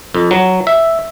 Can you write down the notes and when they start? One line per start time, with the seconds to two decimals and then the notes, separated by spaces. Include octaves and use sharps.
0.15 F2
0.31 F#3
0.67 E5